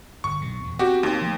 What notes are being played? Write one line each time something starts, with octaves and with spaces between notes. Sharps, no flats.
G1 C#6
B1 B2
D#1 E2
B3 C4 F#4 G4
D#2
F3 A3 A#3